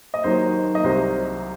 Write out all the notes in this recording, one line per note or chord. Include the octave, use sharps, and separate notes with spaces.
D#5
D#2 D#3 F#3 C5
D#5
C2 C3 F#3 C5